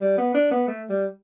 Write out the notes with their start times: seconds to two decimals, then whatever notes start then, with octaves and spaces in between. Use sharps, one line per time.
0.01 G3
0.18 B3
0.34 D4
0.51 B3
0.68 A3
0.89 G3